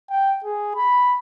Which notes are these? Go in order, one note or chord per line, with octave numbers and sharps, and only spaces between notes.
G5
G#4
B5